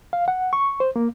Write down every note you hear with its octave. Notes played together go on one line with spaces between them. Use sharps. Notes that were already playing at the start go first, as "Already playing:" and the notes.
F5
F#5
C#6
C5
A#3